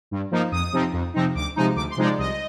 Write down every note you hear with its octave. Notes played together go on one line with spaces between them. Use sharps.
G2
F3 A#3 D#4
F2 D#6
C3 F3 C4 D#4
F2
C3 F3 C4 D#4
D2 D6
C3 F3 G#3 D#4
D2 D6
C6
C3 F3 G#3 D#4
D5
C2 D#5